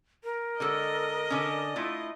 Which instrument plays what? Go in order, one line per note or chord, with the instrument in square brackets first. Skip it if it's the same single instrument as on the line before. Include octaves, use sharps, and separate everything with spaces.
[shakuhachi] A#4
[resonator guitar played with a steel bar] D3 G#3 A4 [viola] D#5
[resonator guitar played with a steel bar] D3 C#4
A3 E4 F4